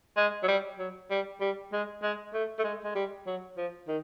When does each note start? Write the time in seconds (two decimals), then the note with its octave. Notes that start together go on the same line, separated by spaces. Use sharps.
0.17 G#3
0.43 F#3
0.48 G3
0.79 F#3
1.10 G3
1.41 G3
1.72 G#3
2.03 G#3
2.34 A3
2.59 A3
2.64 G#3
2.83 G#3
2.95 G3
3.26 F#3
3.57 F3
3.88 D#3